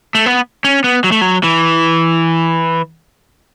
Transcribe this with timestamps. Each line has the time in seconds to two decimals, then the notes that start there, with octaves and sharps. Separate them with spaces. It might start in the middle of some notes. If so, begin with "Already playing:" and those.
0.15 A3
0.26 B3
0.64 C#4
0.84 B3
1.04 F#3
1.12 A3
1.21 F#3
1.43 E3